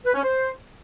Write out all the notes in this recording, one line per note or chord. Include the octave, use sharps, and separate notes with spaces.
B4
C#4
C5